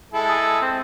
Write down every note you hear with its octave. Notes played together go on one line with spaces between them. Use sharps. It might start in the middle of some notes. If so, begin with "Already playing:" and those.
G#3 E4 A4
G#4
C4